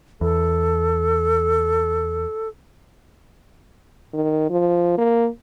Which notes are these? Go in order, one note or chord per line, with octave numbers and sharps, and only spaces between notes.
E2 A4
D#3
F3
A#3